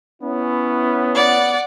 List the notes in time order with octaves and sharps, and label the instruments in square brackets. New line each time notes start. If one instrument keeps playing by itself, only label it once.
[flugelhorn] B3 [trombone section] C#4 E4
[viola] D5 F#5